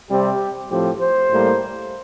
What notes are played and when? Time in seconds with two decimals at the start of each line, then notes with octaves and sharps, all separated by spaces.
0.10 C3 G3 C4 G4
0.70 A2 F3 C4 G4
1.01 C5
1.31 A2 G3 A#3